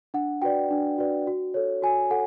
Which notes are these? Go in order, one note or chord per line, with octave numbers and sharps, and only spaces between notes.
D4 F#5
F#4 B4 D5 G5
D4
F#4 B4 D5
F#4
A4 C#5
F#4 G#5
A4 F#5